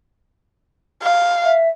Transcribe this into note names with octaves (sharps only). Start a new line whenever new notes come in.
F5
E5